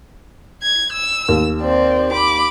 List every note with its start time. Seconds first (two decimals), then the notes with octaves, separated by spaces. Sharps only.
0.63 G#6
0.93 E6
1.28 D#2
1.61 C4 D5
2.12 B5 D6